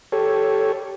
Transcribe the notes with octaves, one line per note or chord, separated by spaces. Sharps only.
G4 A4 C#5